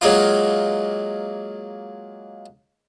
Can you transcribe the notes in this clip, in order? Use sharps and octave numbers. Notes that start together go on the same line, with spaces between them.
F#3 G#3 A#3 F4